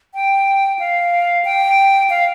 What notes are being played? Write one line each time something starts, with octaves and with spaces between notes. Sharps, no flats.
G5
F5
G5
F5